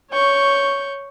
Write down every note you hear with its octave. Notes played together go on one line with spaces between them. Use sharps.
C#5 C#6 G6